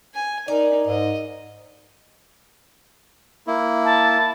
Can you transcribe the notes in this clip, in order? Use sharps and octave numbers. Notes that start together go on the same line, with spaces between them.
G#5
D#4 A#4 D5
G#2 D#5
A#3 E4
A5